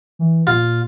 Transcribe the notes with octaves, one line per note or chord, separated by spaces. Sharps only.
E3
A#2 F4